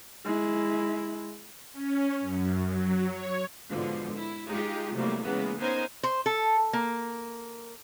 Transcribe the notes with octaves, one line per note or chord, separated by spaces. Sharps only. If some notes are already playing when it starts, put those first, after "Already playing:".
G#3 E4
C#4
F#2
F#3
C#5
G#2 B2 D3 F3
E4
G#3 D#4 F4 G4
A2 C3 F#3 G3 A3 A#3
C#3 E3 G#3 A#3 B3
B3 C#4 D#4 A#4 C5 G#5
C5
A4
A#3